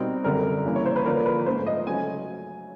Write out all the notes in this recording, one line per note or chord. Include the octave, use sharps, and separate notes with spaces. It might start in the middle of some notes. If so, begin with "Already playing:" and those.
Already playing: B2 G3 C4 D#4 A#4
F#2 D3 G3 A#4
C#3 E3 G3 A#3
C#5
C5
B4
D3 F3 A#3 D4 A#4
B4
G#2 F3 A3 C5
D#5
C#3 F#3 A3 G#5